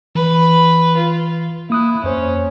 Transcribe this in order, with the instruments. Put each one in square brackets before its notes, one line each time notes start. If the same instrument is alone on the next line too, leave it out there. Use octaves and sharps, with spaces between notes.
[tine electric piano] E3 [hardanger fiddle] B4 B5
[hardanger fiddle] F4
[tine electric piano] A#3 D#6 F#6 [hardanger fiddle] E4
[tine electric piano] F2 C5 [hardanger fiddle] C#4